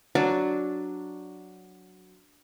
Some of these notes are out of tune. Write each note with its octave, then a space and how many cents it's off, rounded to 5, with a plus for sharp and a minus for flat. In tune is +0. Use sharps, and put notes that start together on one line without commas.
F#3 +0 D4 +0 D6 -30